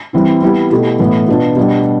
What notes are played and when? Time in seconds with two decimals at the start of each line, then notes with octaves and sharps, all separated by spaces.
0.13 E3 G3 C4 E4
0.42 G3 B3 E4 G4
0.70 B2 A3 E4 G4
0.99 A2 E3 B3
1.28 B2 B3 D4 F4
1.56 B2 G3 D4 G4